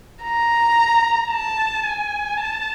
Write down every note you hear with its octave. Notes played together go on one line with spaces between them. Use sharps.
A#5
A5
G#5
A5